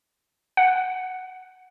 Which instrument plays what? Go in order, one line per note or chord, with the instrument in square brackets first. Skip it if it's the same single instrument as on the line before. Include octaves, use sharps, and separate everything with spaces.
[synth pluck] F#5